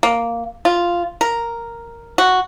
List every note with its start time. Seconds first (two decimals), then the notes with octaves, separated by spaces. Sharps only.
0.03 A#3
0.65 F4
1.21 A#4
2.18 F#4